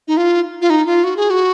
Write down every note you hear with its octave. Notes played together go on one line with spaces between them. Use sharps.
D#4
F4
F4
D#4
F4
F#4
G#4
F#4